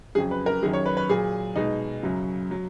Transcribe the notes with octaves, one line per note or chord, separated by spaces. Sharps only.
F2 C#3 F#3 G#4
B4
A#4
F#2 D#3 F#3 G#4
C#5
B4
B4
A#2 F#3 G#4
B2 G#3 D#4
F#2 C#3 F#3
F#3